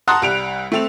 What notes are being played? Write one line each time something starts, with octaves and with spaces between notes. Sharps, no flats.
F#5 A5 A#5 C6 D#6 F#6
C2 G3 D7 F7
A3 C4 F7